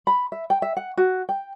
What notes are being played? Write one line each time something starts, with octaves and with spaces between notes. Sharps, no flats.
B5
E5
G5
E5
F#5
F#4
G5